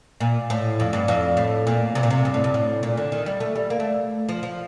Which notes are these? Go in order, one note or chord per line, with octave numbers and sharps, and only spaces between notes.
A#2
A2
F2
G2
F2
A2
A#2
C3
A#2
C3
G2
A2
G2
A2
A#2
D3
D#3
G3
A3
G3
A#3
A3
F3
F3